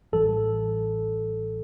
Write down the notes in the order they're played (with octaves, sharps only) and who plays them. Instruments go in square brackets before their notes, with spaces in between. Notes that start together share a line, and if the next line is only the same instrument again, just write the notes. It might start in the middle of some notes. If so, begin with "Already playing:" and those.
[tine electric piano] A1 A2 E3 G3 A4